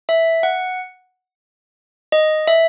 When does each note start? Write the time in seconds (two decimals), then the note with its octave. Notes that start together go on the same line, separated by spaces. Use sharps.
0.09 E5
0.43 F#5
2.12 D#5
2.47 E5